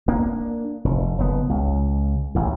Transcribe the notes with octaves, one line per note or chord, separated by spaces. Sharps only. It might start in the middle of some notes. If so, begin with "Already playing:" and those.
A#3 D4
F1
F#1 B3
C#2
A1 D#2